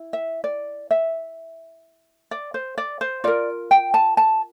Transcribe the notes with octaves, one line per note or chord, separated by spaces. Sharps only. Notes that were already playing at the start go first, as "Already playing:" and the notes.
Already playing: E4
E5
D5
E5
D5
C5
D5
C5
F4 A#4 D5
G5
A5
A5